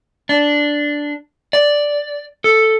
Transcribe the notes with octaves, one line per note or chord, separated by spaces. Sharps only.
D4
D5
A4